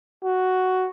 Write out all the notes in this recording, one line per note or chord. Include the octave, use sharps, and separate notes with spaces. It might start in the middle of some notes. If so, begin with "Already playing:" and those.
F#4